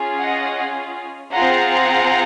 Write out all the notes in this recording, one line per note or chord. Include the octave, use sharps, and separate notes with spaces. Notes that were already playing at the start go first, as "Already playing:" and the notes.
Already playing: C#4 F4 G#4
D#5 F#5
C4 F4 G#4 F#5 A#5